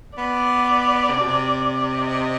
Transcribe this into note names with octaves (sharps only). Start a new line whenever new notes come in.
B3 D5
C3
B2
C3
D#5